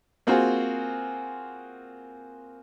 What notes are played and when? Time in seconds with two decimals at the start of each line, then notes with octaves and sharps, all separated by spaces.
0.27 A#3 C4 F4 F#4 G#4 C5